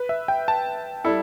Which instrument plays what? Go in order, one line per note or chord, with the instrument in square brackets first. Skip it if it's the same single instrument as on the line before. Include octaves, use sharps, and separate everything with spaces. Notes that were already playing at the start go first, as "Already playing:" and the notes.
Already playing: [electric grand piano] B4
E5
G5
A5
[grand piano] G3 E4 A4